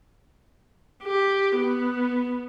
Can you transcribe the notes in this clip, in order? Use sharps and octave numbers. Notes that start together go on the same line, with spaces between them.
G4
B3